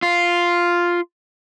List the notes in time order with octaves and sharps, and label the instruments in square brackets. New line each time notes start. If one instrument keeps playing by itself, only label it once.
[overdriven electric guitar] F4